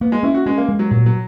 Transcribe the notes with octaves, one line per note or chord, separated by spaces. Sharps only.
A#3 B3
G#3
C#4 E4
F#4
G#3 C#4
A#3
G#3
F#3
A#2 F#3
F#3